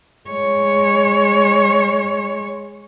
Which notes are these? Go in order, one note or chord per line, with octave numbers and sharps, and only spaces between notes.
G#3 C#5